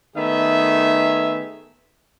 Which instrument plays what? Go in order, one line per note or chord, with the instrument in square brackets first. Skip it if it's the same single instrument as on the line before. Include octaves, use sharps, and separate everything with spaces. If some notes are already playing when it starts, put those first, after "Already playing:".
[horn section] D#3 A3 B3 D#4 G#4 E5